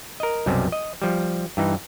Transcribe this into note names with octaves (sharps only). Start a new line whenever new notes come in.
A#4 D#5
B1 F#2 C3 G3
D#5
F3 G3
G2 E3 D#4